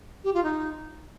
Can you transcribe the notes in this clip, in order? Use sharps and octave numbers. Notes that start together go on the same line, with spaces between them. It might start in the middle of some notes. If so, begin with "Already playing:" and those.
G4
F4
D#4